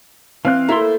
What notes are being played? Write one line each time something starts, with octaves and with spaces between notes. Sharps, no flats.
E3 C4 F5 F#6
A3 A#3 E4 A#5 C6
C5